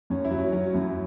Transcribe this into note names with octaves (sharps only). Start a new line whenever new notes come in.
F#2 C#4
E4
F#3
C#4
F#3 C#4
F#2 E4